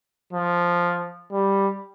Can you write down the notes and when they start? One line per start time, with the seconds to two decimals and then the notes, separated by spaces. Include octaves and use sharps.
0.33 F3
1.33 G3